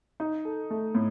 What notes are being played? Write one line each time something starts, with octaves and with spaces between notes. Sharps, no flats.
D#4
A4
A3
A2